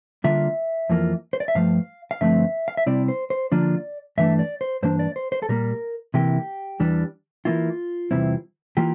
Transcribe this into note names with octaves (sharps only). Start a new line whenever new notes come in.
D3 G3 A#3 D4 F4 E5
F2 E3 A#3 F4
C5
D5
E5
G2 F3 A3 F5
F5
G2 D3 F3 A3 C4 E5
F5
E5
C3 G3 C4 E4 D5
C5
C5
D3 F3 A#3 D4 F4 D5
G2 E3 A3 D4 E5
D5
C5
G2 E3 A#3 D4 C5
D5
C5
C5
A4
A#2 G3 A#3 A#4
C3 E3 A#3 E4 G4
E2 E3 G3 D4
E3 A#3 E4 F4
E2 C3 G3 C4 E4
E3 A#3 F4 G4